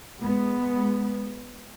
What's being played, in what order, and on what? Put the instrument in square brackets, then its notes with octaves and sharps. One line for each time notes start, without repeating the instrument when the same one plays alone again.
[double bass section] G#3 B3